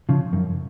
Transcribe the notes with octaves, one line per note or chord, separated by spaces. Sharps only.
C#3 F3
F#2